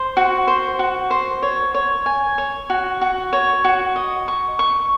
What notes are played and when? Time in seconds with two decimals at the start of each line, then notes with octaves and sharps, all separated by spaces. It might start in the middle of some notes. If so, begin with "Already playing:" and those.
Already playing: C5
0.17 F#4
0.48 C5
0.79 F#4
1.11 C5
1.42 C#5
1.74 C#5
2.06 G#5
2.38 C#5
2.70 F#4
3.01 F#4
3.33 C#5
3.64 F#4
3.96 D#5
4.28 C#6
4.59 C#6